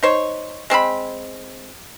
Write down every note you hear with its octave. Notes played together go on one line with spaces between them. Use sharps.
D#4 C5 C#5
G#3 C4 A4 B5